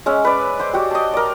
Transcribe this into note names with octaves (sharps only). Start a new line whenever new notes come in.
G#3 C#4 E5
B4 D5
C5 C6 D6
F#4 G4
D#5 A5
A#4 D5